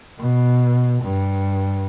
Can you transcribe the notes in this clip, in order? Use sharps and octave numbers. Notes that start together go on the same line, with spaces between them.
B2
G2